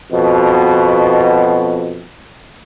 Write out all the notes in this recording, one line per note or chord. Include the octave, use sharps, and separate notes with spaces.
F2 B2